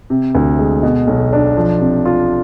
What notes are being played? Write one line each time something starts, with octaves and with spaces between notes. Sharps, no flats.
C3
D2
G#3
B2
B1
D4
F3
C3
F4